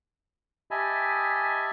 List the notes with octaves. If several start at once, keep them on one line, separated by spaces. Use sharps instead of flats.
G4 D#5 E5 G#5 A5 B5